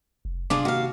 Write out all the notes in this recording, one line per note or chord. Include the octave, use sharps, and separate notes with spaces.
F1
C3 D4 F4 G#4 D5 D6
D#2 F#4 F5